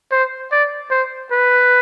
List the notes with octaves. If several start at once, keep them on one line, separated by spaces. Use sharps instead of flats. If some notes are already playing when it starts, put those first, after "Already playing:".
C5
D5
C5
B4